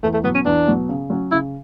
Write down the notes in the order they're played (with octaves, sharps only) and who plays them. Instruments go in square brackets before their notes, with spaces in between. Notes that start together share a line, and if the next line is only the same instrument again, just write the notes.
[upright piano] E2 [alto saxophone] A3
[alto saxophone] A3
[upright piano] B2 F#3 [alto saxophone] B3
[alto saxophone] C#4
[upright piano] E2 [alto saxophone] D4
[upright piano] B2 F#3
C#3
F#3 C#4
[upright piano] C#3 [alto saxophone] E4